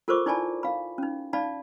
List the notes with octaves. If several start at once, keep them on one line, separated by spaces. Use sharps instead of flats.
F4 A4 A#4 C5 C#6 D6
D#4 E4 D5 G#5 A5 B5
F5 B5
C#4 D#4
D#4 D5 F5 A5 B5